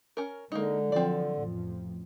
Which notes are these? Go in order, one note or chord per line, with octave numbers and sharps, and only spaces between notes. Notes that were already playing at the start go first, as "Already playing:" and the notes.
C#4 A#4
D3 G#3 A#3 D#4
F3 F#3 C4 D5
A1 F2 F3